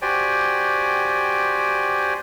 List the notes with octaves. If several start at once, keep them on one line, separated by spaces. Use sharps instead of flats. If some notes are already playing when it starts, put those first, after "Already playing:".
F#4 G4 C5 D5 G5 G#5